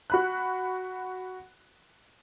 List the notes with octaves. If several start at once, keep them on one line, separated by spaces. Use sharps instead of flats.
F#4 B5 F#6